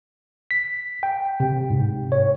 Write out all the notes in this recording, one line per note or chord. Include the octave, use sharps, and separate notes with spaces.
B6
G5
C3
G#2
C#5